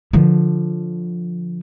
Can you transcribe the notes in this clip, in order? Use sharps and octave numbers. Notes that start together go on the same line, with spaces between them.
D3 F3